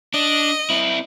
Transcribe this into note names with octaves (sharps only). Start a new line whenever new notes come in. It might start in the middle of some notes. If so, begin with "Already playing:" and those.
D4 D#5
C4 E4